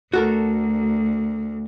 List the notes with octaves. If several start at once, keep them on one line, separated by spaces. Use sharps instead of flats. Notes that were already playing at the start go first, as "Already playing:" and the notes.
D2 F#4 A4 A#4